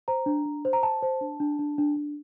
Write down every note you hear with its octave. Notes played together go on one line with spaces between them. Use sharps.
C5 A#5
D4
D4
C5
A#5
C5 A5
C5
D4
D4
D4
D4
D4